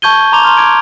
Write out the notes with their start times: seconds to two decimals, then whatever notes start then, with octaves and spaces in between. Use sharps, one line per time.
0.02 A5 C#6 G6 G#6 D#7 G7
0.32 A#5 C6 D6 F7 G7
0.44 A#5 C6 F6
0.57 D6 G#6 D7